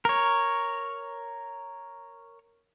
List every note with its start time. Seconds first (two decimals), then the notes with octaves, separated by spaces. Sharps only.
0.05 A#4 C#5